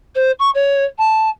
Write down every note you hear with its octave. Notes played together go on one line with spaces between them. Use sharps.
C5
C#6
C#5
A5